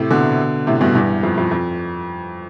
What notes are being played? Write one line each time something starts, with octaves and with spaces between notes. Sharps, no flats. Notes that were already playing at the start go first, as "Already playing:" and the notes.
Already playing: A2 C3
B2 D3
A2 C3
G2 B2
E2 G2
F2
F2
F2